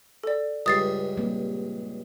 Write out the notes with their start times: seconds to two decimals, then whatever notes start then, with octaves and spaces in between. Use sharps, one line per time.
0.23 A4 D5
0.66 C#2 G2 D#6 A6 C7
1.17 G3 A#3 C4